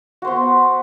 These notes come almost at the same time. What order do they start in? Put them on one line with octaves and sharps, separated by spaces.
F#4 C5 B3